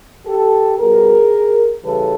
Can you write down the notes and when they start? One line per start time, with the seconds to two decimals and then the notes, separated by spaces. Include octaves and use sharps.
0.26 G4 A4
0.78 B2 G3 G#4 A#4
1.83 C#3 E3 G3 A4 B4